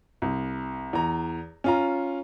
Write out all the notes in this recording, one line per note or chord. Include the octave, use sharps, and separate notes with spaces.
C2
E2 A#5
C#4 F4 A#5